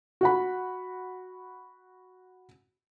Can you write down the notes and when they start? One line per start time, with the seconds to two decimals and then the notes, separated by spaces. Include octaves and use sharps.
0.21 F#4 F#5 B5